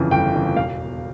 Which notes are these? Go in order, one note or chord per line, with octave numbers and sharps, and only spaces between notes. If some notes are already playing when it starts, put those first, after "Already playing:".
Already playing: G1 F2 C#3 E3
G1 G5
F2 C#3 E3
E1 F5